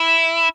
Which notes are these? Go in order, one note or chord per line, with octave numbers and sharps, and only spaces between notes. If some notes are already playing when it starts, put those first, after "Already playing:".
Already playing: E4